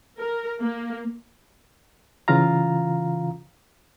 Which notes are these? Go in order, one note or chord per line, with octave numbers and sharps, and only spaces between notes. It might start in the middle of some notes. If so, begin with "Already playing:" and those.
A#4
A#3
C#3 E3 F4 F5 A#5